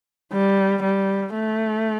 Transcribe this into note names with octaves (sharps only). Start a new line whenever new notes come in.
G3
G3
A3